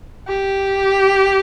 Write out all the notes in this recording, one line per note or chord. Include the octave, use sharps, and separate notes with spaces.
G4